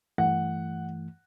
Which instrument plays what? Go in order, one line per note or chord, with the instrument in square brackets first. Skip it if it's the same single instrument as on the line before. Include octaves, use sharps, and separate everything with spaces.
[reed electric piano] G2 E3 A3 [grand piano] F#5